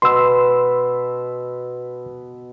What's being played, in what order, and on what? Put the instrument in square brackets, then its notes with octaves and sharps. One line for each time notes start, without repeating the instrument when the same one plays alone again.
[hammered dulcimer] B2 B3 [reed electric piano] C6 E6